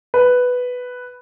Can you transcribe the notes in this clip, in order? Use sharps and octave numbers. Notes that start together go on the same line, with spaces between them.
B4